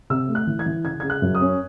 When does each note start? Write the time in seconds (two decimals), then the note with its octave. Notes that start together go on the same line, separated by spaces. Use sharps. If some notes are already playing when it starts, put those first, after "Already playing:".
0.10 C3 E6
0.28 A3
0.35 F#6
0.47 E3
0.59 G#6
0.66 E3
0.85 C#3 G#6
1.00 C#3 G#6
1.10 F#6
1.22 F#2
1.35 D#6
1.41 C#4